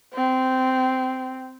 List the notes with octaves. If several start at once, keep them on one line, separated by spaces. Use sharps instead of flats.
C4